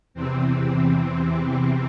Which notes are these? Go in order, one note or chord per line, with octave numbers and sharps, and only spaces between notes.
E2 C3 E3 C4